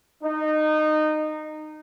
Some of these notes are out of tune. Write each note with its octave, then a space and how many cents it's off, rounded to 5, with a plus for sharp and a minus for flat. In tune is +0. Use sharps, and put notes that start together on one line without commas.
D#4 -20